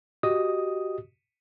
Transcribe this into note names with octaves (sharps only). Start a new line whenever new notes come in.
F#4 G4 D#5 D#6